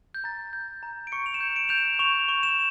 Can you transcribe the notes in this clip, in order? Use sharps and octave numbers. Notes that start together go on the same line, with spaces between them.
G6
A#5 A6
G6
A#5
D7
C#6 C#7
F7
E7
G6
D7
G6 F7
E7
C#6 F7
C#6
E7